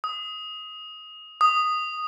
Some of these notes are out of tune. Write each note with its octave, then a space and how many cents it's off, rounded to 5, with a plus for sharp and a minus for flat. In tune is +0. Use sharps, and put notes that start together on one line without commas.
D#6 +20
D#6 -10